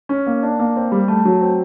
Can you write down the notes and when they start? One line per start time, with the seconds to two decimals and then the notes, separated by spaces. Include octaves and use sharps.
0.09 C#4
0.27 A#3
0.43 D4
0.59 A#3
0.76 C4
0.92 G3
1.08 A3
1.25 F#3
1.41 C4